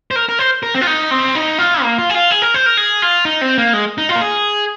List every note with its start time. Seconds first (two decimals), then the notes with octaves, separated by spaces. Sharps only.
0.11 C5
0.16 A#4
0.29 A#4
0.39 C5
0.63 A#4
0.74 C4
0.81 F4
0.87 D#4
1.11 C4
1.35 D#4
1.58 F4
1.82 A#3
1.98 F4
2.10 G#4
2.15 F4
2.31 G#4
2.42 A#4
2.54 C5
2.66 A#4
2.77 G#4
3.02 F4
3.25 D#4
3.41 C4
3.58 A#3
3.73 G#3
3.98 D#4
4.09 F4
4.16 A#4
4.21 G#4